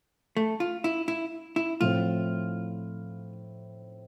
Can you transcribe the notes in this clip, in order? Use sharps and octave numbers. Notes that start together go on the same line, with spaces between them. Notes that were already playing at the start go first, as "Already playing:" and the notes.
A3
F4
E4
E4
E4
A2 F3 C4 E4 F4